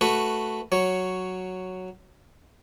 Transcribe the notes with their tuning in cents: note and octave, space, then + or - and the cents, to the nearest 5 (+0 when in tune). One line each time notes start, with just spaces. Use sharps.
A3 +0 F#4 +0 B4 +5
F#3 +0 C#5 +0